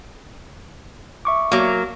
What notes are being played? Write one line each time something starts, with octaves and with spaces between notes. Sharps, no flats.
E5 C#6 D6
F#3 A#3